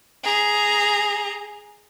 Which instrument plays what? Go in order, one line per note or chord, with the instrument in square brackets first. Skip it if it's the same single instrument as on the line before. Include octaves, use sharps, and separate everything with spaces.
[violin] G#4 A#5